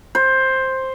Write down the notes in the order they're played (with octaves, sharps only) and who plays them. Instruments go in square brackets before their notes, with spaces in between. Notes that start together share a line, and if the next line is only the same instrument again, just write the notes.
[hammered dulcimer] C5